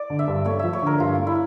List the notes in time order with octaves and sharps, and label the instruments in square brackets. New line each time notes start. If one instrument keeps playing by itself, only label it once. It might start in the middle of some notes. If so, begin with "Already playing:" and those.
Already playing: [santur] D5
[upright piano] D3
[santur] E5
[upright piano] G2
[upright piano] A3 [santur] C#5
[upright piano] F3 [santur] E5
[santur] C#5
[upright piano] D3 [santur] A#4
[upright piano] G2 [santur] F4
[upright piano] A3
[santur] E4